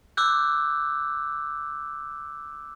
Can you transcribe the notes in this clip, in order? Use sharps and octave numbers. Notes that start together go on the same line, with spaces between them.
D6 E6 F#6 G6